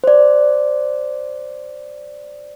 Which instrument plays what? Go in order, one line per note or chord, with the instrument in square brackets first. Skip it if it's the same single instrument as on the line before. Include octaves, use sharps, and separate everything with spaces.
[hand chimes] C5 D5